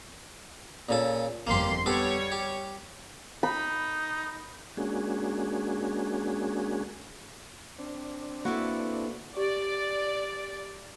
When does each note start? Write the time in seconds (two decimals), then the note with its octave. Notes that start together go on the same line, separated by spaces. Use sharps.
0.89 A#2 C#3 A4
1.47 G1 F2 A#3 G4 C6
1.86 G3 B3 G4 A4 C#5
2.32 G4
3.43 D#4 B5
4.77 G#3 A#3 C#4 D4 F#4 G#4
7.78 C4 D4
8.45 A#3 E4 F#4 A4 B4
9.37 G4 D5